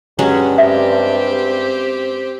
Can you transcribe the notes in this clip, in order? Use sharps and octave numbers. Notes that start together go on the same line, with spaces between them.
G2 F#3 G#3 C#4
C4 G4 E5